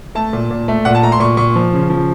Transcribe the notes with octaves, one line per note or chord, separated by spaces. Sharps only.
A3 A5
A#2
A#2
A3
A#2 F#5
A5
A3 A#5
C6
A#2 C#6
A#2 C#6
F3
C#3
F3